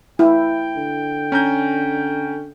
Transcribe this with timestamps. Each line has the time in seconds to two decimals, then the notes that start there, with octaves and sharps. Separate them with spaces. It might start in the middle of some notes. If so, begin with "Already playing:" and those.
0.19 E4 G5
0.75 D3
1.32 C#4 A#5 G6